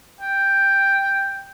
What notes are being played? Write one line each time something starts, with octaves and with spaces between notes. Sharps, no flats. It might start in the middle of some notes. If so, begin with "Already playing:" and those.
G5